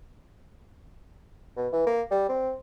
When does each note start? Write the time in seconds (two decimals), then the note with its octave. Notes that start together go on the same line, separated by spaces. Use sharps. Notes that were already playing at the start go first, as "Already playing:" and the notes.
1.57 B2
1.73 E3
1.86 A#3
2.11 G3
2.29 C4